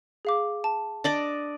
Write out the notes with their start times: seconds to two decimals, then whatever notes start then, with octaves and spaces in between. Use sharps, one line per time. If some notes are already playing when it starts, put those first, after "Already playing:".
0.25 G#4 F5 D6
0.64 A5
1.04 D4 D5 D#5